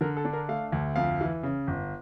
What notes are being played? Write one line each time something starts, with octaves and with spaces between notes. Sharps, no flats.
D3 A#4
A4
D4
A#4
A3 F5
D2
F2 F5
E3
C#3
G1